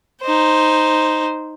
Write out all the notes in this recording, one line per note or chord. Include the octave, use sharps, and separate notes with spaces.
D#4 C5